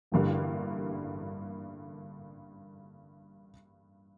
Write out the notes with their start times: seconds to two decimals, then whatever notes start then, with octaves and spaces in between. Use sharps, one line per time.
0.12 A1 G2 D3 G3 A#3